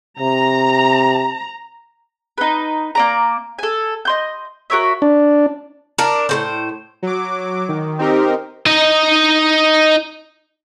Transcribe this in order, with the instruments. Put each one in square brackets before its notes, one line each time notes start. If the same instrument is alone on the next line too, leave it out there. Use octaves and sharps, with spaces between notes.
[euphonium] C3 [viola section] A#5
[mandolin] D#4 B4
A#3 D5 A#5
A4 G#5
D#5 C6 G6
F#4 A#4 C#5 E5
[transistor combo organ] D4
[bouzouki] D4 A#4
A2 C#3 C5
[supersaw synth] F#3 D6
D#3
C4 D#4 G4 A#4
[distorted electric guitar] D#4 D#5